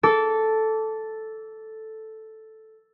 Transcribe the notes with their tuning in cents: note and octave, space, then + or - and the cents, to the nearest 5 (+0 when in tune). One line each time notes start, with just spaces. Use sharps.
A4 +0 D6 -25